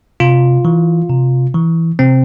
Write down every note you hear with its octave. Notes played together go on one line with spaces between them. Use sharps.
C3 F4
E3
C3
E3
C3 C4